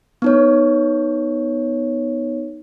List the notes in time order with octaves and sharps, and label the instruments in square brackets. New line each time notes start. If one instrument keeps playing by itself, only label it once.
[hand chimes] B3 D#4 C#5